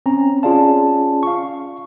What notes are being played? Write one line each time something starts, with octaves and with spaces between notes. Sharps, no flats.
C4 C#4 A#5
C#4 F4 G#4 D5 F5 A5
F5 C#6